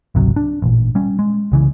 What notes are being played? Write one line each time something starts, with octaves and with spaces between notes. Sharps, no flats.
G#1 C#2 C3 F#3
D4
A1 A#2
G3 C#4
G#3
C2 C#3 E3